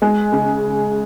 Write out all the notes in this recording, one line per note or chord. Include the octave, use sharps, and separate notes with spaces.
G#3
C#3